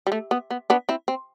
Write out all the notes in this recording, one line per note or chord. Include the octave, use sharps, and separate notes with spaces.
G3
A3
B3
B3
B3 D4
C4 E4
C4